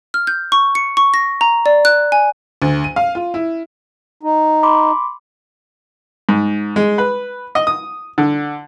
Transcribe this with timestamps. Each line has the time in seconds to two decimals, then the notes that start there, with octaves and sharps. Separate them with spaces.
0.14 F6
0.27 G6
0.52 C#6
0.75 C#7
0.97 C#6
1.14 A#6
1.41 A#5
1.66 D5
1.85 F#6
2.12 G#5
2.62 D2
2.84 D#7
2.96 F5
3.15 F4
3.34 E4
4.23 D#4
4.63 B5 C6 D6
6.29 G#2
6.76 G#3
6.98 B4
7.55 D#5
7.67 D#6
8.18 D3